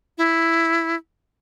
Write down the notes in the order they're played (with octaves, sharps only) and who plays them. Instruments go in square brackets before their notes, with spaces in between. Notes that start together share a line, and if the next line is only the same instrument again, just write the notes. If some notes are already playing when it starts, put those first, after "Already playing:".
[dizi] E4